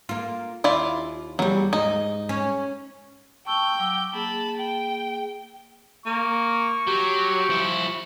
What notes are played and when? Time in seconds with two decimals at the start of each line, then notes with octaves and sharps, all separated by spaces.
0.09 A#3 F4
0.64 D#2 E4 F4 D5
1.39 E2 F#3 G3
1.73 G#2 D#4
2.29 C#4 C#5
3.46 G5 A5 C#6 E6 G6
3.79 F#3 D6 E6
4.14 A#3 G#4 A5 B5
4.57 G5
6.06 A#3 C#6
6.87 F#3 G4
7.50 F3 E4